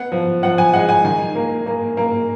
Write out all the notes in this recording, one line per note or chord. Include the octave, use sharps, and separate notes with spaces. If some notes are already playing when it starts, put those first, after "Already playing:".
Already playing: B3 F#5
F3
F3 F#5
G#5
G#3 F#5
G#5
D#3 G#5
A#3
A#3
A#3